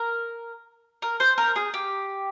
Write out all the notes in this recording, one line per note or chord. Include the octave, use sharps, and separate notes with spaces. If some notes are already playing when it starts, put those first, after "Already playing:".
Already playing: A#4
A#4
C5
A#4
G#4
G4